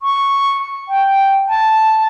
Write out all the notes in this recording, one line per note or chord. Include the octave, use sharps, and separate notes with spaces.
C#6
G5
A5